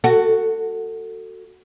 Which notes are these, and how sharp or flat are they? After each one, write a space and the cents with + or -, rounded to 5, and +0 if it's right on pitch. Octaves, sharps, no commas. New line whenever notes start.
F#4 +0 A4 +25